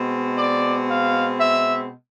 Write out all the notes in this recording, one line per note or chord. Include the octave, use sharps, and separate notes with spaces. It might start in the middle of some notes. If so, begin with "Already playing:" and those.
Already playing: B2 G#3 C4
D5
F5
E5